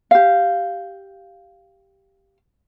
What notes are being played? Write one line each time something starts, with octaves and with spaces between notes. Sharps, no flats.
G4 F5